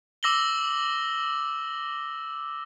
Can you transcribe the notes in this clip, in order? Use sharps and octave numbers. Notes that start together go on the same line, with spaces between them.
D6 E6 A#6 F#7 G7